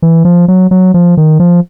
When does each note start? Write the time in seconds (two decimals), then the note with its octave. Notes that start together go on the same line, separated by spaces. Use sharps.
0.02 E3
0.25 F3
0.48 F#3
0.71 F#3
0.94 F3
1.17 D#3
1.40 F3